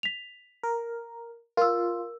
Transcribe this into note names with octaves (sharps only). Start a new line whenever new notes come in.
B6 F7
A#4
F4 A#4 E6